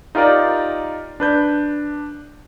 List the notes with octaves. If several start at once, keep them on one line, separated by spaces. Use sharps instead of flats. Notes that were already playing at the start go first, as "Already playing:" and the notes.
D#4 F4 G4 A#4 D5
D4 B4 G6